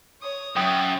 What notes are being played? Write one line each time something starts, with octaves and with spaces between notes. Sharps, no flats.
C#5 D#6
F#2 E5 G5 D#6